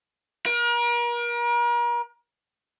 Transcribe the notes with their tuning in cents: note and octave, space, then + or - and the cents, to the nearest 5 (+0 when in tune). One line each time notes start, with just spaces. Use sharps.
A#4 +40